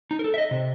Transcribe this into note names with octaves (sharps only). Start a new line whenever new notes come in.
D#4
A#4
A4
E5
D#5
C3